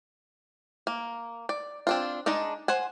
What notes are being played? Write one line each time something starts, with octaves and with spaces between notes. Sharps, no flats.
A#3
D5
C4 D4 F4
G#3 D4 D#4 D5
C5 F#5 G#5